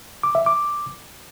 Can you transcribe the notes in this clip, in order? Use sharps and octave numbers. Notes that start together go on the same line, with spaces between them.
D6
E5
D6